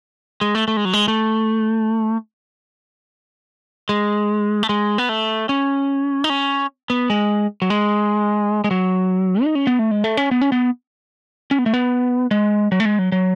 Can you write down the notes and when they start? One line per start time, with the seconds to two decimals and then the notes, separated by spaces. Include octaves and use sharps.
0.41 G#3
0.55 A3
0.68 A3
0.77 G#3
0.85 F#3
0.93 G#3
1.08 A3
3.89 G#3
4.63 A3
4.69 G#3
4.98 B3
5.09 A3
5.49 C#4
6.24 D#4
6.30 C#4
6.90 B3
7.10 G#3
7.62 F#3
7.70 G#3
8.64 G#3
8.71 F#3
9.44 D#4
9.55 C#4
9.67 B3
9.79 A3
9.91 G#3
10.04 A3
10.17 C#4
10.31 B3
10.41 C#4
10.52 B3
11.51 C#4
11.59 B3
11.66 A3
11.73 B3
12.31 G#3
12.72 F#3
12.80 A3
12.85 G#3
12.99 F#3
13.12 F#3